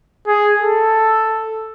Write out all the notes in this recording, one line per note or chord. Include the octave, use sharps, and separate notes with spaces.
G#4
A4